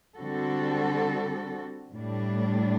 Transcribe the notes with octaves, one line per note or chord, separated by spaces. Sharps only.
D3 G3 C4 F#4 A4
A2 G3 D4